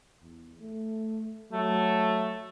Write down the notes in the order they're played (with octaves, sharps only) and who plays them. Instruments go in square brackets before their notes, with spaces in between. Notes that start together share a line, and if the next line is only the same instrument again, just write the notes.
[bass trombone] E2
A3
[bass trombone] F#3 [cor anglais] A3